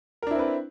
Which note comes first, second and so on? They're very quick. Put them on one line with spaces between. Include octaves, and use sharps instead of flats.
A#4 D4 E4 C4 B4